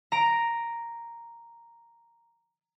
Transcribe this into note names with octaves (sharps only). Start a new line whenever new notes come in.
A#5 D7